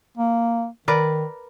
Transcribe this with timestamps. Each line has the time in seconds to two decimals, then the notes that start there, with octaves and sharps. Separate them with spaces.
0.18 A#3
0.88 D#3 A#4 B4 D5